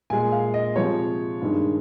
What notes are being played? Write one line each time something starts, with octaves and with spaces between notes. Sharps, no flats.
A#2 G#3 G#5
F5
D#5
C3 F3 G#3 C#5
G2 D#3 G#3